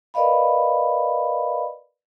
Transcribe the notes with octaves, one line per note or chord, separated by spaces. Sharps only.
A#4 B4 D5 D#5 F5 B5